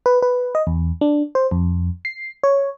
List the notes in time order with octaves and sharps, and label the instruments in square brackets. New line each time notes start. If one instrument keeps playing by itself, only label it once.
[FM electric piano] B4
B4
D#5
E2
D4
C5
F2
C7
C#5